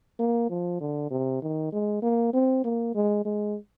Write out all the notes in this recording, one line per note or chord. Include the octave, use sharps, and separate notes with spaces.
A#3
F3
D3
C3
D#3
G#3
A#3
C4
A#3
G#3
G#3